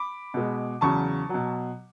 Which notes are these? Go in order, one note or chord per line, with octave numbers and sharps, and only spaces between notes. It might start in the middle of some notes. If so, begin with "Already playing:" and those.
Already playing: B5 D6
B2 G#3
E2 C#3 F#3 A5 C#6
B2 F#3